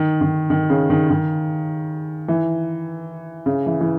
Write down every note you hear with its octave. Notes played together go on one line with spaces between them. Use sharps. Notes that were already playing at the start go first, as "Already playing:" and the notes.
Already playing: D#3
D#3
D#3
C#3
D#3
D#3
E3
C#3
E3
E3